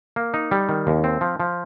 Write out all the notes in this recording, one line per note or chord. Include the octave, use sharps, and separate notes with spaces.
A#3
D#4
G3
D#3
D#2
C4
F3
F3